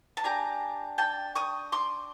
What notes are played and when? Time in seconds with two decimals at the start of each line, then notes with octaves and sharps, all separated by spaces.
0.17 A5
0.24 D4 G4 G#5 A#5
0.98 G5 A5
1.35 C#6 D#6
1.72 C6 D6